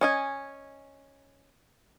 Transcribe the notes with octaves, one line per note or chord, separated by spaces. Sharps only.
C#4 D#5 G#5